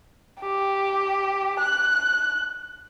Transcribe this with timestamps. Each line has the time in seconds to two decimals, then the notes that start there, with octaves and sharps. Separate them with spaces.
0.41 G4
1.60 F#6